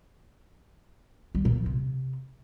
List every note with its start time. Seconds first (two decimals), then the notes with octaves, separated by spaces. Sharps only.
1.35 G3
1.45 A#2
1.55 F3
1.66 C3